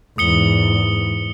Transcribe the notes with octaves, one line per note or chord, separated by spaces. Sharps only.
E2 G#2 D#6 C#7 G7